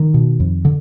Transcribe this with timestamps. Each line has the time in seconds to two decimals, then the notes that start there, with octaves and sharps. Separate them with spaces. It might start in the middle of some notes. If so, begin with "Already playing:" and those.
Already playing: D#3
0.14 B2
0.40 F2
0.65 D3